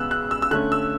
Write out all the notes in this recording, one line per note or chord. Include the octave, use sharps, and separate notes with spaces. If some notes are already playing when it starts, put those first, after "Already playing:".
Already playing: C#3 G#3 B3 E6 F#6
F#6
E6
E6
D3 A3 C#4 F#6
E6